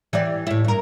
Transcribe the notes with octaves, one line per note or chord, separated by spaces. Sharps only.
E3 G4 D5
A2 E4
G2 A#4